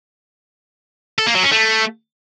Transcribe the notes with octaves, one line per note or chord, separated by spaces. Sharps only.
A4
A#3
F#3
C#4
A3